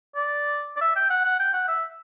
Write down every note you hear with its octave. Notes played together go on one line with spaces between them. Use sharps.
D5
D5
E5
G5
F#5
F#5
G5
F#5
E5